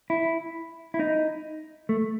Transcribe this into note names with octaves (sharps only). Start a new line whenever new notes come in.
E4
E4
D#4
A3